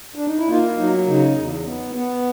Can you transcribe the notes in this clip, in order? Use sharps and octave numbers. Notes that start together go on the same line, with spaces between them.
D4
D#4
E4
A#3 D#4 F4
F#3 D#4
C#3 D#4
E2
B3
B3